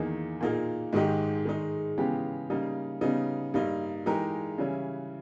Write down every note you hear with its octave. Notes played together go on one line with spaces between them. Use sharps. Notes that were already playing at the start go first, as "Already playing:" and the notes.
Already playing: E2 D#3 A#3 D#4 G#4
A#2 A#3 D#4 G#4
G#2 D#3 G#3 D#4 G4
D#3 G#3 D#4
C#3 E3 G#3 B3 G4
C#3 G3 A#3 D#4
C#3 G3 B3 D#4
G2 G3 A#3 D#4
E3 G#3 D#4 G4 A#4
C#3 E3 G3 C#4 E4